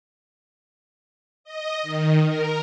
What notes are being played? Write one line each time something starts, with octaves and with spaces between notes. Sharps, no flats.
D#5
D#3
A#4